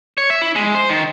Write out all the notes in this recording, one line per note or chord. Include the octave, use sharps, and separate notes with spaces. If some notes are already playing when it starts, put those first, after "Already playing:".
C#5
E5
E4
G#3
C5
D#3